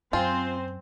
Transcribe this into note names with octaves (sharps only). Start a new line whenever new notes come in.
F#2 C4 F4 C5 G5 G#5